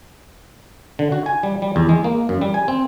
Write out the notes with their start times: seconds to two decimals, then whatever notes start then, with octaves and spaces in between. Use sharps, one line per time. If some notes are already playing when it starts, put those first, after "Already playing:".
0.99 D3
1.12 F#4
1.26 G#5
1.43 G3
1.62 G3
1.76 E2
1.89 G#3
2.04 A#3
2.29 F#2
2.41 G3
2.54 G#5
2.68 C4